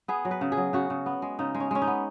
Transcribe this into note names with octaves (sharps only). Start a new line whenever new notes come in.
B3 G#4
F#3
B4
C#3
G#4
F#3
C#3 F#4
C#3
B3
G#3
C#3 D#4
G#3
C#4
G#3 C#4
D#4
B3